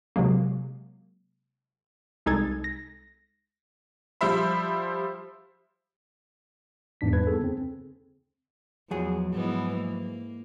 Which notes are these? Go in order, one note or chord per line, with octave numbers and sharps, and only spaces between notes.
C3 F#3 G#3 A#3
C2 G#3 D#4 A4 G#6 A6
A#6
F3 G3 C5 E5 B5
E2 G#2 D4 B6
G3 B4 G#6
B3 D#4 G#4 A4
C#3 C4
E2 F3 F#3 G#4
G#2 E3 B3
A#3